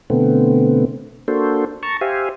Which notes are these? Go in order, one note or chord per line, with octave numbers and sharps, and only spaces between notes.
B2 D3 A3 B3 C4
A#3 D4 F#4 A4 C5
A5 A#5 C#6
G4 C5 E5 F5 G#5